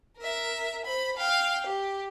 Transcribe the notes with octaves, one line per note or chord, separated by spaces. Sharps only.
A#4 E5
C5 B5
F5 G5
G4